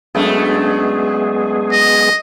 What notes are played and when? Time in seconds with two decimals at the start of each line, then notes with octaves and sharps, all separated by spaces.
0.15 F#2 G#3 A3 B3 D4 G#4
1.72 D#5